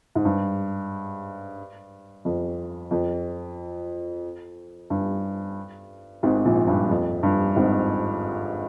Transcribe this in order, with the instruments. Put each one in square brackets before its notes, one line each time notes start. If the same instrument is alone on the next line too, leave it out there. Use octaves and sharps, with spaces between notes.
[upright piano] G#2
G2
F2
F2
G2
G#1 G#2
A#1 A#2
G2
F2
G2
G#1 G#2